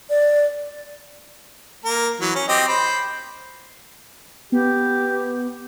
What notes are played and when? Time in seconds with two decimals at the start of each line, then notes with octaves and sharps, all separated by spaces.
0.10 D5
1.85 A#3 A#4
2.20 E3 F#3
2.35 C#4
2.48 C4 G4 D#5
2.68 C5 B5
4.52 B3 G4